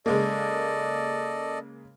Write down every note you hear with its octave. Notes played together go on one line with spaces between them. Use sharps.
C#3 G#3 A#3 A4 D5 D#5